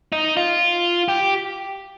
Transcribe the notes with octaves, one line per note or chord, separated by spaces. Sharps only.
D#4
F4
G4